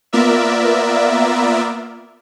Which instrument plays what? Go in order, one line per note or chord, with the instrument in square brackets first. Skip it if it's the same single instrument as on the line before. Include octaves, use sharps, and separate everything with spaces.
[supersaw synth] A#3 B3 F4 A#4 D5 E5